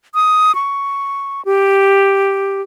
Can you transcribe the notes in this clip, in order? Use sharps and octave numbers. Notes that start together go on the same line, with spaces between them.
D#6
C#6
G4